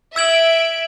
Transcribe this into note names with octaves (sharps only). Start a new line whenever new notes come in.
E5 E6 G#6 D7 F#7